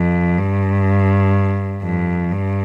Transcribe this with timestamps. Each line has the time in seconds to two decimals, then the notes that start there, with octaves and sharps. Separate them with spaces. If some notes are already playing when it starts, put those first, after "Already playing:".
Already playing: F2
0.38 G2
1.82 F2
2.32 G2